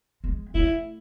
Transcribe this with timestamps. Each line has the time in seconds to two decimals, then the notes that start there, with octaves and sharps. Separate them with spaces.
0.24 G#3
0.54 A3 E4